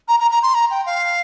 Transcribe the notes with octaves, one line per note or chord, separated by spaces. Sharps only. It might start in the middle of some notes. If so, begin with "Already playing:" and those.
A#5
A#5
A#5
C6
A#5
G5
F5